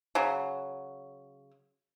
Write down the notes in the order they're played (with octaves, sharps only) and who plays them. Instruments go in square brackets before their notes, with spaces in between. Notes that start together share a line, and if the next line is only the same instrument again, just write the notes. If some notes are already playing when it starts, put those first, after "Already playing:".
[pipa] C#3 F#3